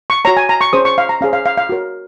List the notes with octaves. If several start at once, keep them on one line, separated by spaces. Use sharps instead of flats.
C#6
F#4 C#5 A#5
G#5
A#5
C#6
C#4 G#4 C5 D#6
C#6
F5
A#5
C#4 G#4 C5 F5
F5
F5
F5
F#4 A#4 C#5